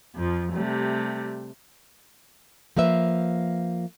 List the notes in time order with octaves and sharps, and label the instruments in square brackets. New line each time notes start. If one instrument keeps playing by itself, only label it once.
[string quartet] F2 F3
C3 G3 A3
[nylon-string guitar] F3 A#3 B4 E5